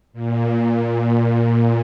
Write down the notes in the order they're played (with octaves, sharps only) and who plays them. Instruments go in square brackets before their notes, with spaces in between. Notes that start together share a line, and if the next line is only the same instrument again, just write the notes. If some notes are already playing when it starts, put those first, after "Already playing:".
[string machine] A#2